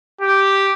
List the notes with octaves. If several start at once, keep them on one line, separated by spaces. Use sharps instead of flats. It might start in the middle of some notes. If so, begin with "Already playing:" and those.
G4